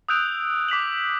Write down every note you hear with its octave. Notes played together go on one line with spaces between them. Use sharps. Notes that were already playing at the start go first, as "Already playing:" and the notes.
D#6 E6 F#6 G6 D7 F7
D6 B6 F7 F#7